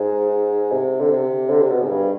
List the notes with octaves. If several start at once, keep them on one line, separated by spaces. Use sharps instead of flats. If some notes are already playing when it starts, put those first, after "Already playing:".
Already playing: G#2
C3
D3
C3
D3
C3
B2
G#2
G2